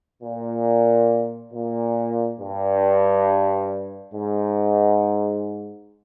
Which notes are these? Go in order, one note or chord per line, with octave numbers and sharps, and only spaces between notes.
A#2
A#2
G2
G#2